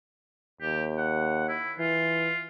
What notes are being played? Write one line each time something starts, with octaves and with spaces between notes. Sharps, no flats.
D#2 G4
F#5
E4
E3 F4